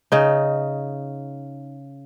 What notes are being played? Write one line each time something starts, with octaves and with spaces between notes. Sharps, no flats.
C#3 D#4